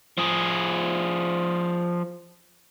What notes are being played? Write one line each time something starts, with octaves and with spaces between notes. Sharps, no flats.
F3 G#4